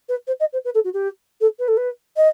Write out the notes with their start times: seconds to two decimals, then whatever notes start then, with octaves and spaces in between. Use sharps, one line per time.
0.09 B4
0.27 C5
0.40 D#5
0.53 C5
0.65 B4
0.75 A4
0.84 F#4
0.94 G4
1.41 A4
1.59 B4
1.68 A4
1.77 B4
2.17 D#5